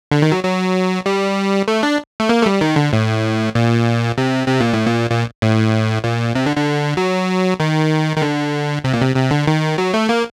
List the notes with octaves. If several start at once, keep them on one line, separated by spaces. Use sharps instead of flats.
D3
D#3
F#3
F#3
G3
A3
D4
A3
A#3
A3
G3
D#3
D3
A2
A#2
C3
C3
A#2
A2
A#2
A#2
A2
A#2
C3
D3
D3
F#3
D#3
D#3
D3
C3
A#2
C3
C3
D3
D#3
F#3
A3
A#3